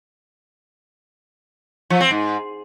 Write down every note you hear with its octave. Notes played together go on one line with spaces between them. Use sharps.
F3
C4
G#2